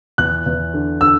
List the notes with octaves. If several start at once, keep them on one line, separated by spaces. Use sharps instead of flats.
E2 F#6
E2
D3
D3 E6